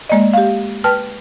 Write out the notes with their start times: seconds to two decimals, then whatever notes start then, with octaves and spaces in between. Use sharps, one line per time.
0.10 G#3 A#3 D5 D#5
0.34 G4 F5
0.84 B4 G5 A5 F6